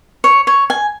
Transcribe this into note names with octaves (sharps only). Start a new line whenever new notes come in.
C#5
C#5
G#5